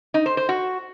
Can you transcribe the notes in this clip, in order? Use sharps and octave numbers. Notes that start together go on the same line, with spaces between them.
D#4
C5
C5
F#4